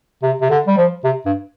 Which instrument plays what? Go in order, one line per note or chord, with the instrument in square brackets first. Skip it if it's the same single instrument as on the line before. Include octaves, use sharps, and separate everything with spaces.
[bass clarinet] C3
C3
D3
G3
F3
C3
G2